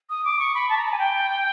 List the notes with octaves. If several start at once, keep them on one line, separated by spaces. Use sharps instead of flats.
D#6
D6
C#6
B5
A5
A#5
A5
G#5
G5